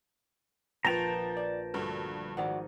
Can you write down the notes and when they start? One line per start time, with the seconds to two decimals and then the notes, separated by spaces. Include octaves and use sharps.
0.85 A#1 F3 B4 G5 A5 A#5 F7
1.37 D5
1.74 D2 G2 F#4 A4 A#4
2.37 G#1 D#4 F#4 D5 F#5